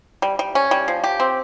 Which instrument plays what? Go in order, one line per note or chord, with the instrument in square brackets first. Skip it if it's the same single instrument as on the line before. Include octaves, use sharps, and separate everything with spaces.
[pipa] G3
G3
C#4
G3
F3
G4
C4